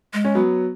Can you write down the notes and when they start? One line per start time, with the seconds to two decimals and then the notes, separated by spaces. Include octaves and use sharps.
0.13 G#3
0.25 C#4
0.35 F#3 B3